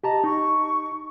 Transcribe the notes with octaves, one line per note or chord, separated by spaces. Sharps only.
G4 D#5 A5 A#5
D#4 C#6